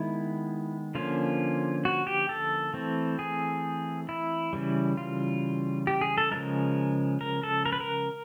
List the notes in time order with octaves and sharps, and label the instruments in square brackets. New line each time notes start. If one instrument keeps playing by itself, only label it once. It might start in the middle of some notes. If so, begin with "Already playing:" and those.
Already playing: [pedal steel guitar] D#3 G#3 B3 E4
D3 F3 A#3 C#4 F4
F#4
G4
A4
E3 A3 C4
G#4
E4
C#3 E3 G3
F4
G4
G#4
A4
C#3 F3 G#3 A#4
A#4
A4
A#4
B4
A#4